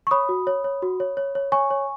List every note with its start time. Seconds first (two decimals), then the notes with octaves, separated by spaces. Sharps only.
0.07 C#6
0.11 C#5 B5 D#6
0.29 F#4
0.47 C#5
0.64 C#5
0.82 F#4
1.00 C#5
1.17 C#5
1.35 C#5
1.52 C#5 G#5 C#6
1.71 C#5